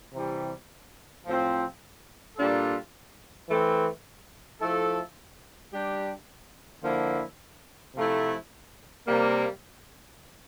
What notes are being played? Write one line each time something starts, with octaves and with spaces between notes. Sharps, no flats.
C3 E3 G3
A2 F3 C4 F4
A#2 G3 D4 F4 A4
E3 A3 C4
F3 A3 E4 A4
G3 D4 G4
D3 F3 A#3 E4
C3 F3 A3 E4
C3 G3 A#3